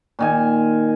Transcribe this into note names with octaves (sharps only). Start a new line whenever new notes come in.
A#2 D#3 G#5